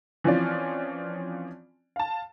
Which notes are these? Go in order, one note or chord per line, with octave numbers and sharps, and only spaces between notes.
E3 F3 C4 C#4 F4 D5
F5 A5